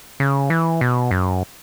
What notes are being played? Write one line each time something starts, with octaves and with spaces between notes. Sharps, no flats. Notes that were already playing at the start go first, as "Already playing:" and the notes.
C#3
E3
B2
F#2